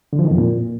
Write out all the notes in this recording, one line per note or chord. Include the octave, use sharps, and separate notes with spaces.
D3
F3
D#3
F2
A#2